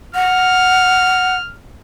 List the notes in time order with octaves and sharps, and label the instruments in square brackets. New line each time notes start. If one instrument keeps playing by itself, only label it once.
[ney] F#5 [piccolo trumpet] F6